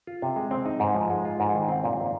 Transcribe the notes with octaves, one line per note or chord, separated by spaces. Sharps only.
F4
C3
G#3
C4
D#4
G#2
F3
G#3
F4
G#2
D#3
C4
A#2
A#2